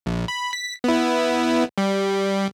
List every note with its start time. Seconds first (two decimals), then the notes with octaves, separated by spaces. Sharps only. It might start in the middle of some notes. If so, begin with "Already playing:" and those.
0.06 A#1
0.28 B5
0.53 B6
0.84 B3 E4
1.78 G3